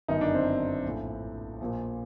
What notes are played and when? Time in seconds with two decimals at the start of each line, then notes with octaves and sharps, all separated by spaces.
0.08 G1 F#2 D#3 D#4
0.21 D4
0.34 C4
0.84 A#1 A2
1.61 A#1 A#2